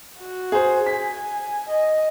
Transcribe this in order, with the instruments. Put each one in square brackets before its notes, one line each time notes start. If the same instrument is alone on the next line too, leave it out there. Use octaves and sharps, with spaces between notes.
[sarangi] F#4
[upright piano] G#4 C5
[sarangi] G#5 [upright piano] B6
[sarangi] D#5